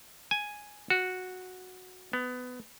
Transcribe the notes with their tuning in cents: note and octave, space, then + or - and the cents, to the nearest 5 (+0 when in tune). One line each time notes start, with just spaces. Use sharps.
G#5 +0
F#4 -5
B3 +20